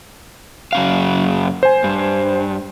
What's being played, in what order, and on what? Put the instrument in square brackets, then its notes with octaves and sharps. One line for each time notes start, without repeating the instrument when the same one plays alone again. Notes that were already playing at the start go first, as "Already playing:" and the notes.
[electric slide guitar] F#2 C#3 F5
[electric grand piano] C5 G#5
[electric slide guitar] G2